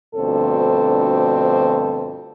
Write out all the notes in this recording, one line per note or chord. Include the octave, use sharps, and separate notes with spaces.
D2 G2 B2 F3 C4 A4